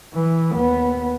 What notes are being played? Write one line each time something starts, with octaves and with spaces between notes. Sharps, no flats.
E3
D#2 B3